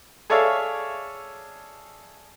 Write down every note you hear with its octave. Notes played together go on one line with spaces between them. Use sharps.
G#4 A4 C#5 D5 E5 F5